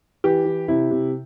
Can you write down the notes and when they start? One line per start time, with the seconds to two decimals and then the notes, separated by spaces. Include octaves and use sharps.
0.24 E3 G4
0.45 E3
0.68 C3 E4
0.91 C3